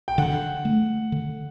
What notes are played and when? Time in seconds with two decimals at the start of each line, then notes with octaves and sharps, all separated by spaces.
0.08 G5
0.18 D3 F#5
0.65 A3
1.12 D3